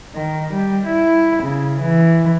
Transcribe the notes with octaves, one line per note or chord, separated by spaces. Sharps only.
D#3
G3
E4
C#3
E3